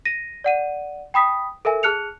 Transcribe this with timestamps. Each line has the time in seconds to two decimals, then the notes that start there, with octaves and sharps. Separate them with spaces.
0.05 A#6 D#7
0.44 D5 F#5 D#7
1.14 G5 B5 D#6 B6
1.65 A4 A#4 E5 G#5
1.83 G#4 A5 F6 F#6 C#7 F7